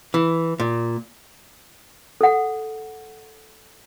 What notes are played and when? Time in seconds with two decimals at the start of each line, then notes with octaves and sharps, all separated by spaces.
0.14 E3
0.60 A#2
2.21 A4 F#5